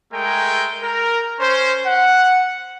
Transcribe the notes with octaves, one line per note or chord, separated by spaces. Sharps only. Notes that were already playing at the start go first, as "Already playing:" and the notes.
G#3 A3 G#4 A#4 G5
A#4
C#4 C5
F#5